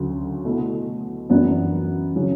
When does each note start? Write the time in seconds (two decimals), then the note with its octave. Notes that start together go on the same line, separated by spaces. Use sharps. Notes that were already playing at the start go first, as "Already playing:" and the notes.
Already playing: D2 C#3 F#3
0.45 B2 A3 E4
1.30 F#2 E3 B3 D4
2.16 C#3 F#3 C#4